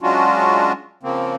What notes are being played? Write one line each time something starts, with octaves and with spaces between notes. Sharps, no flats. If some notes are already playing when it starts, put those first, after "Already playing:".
F#3 G#3 C#4 D4 F4 F#4
C#3 F3 A#3 C4